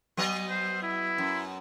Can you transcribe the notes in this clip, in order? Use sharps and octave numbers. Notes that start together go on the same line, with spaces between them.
F#3 B3 D#5
C5
E4
F#2